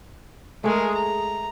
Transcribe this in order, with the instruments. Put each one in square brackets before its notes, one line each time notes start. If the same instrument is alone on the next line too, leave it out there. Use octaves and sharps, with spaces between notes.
[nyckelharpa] G#3 A#4 [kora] A3 G#4
[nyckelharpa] A#5